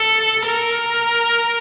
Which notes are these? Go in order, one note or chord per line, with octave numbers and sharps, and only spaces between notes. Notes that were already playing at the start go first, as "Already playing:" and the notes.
Already playing: A4
A#4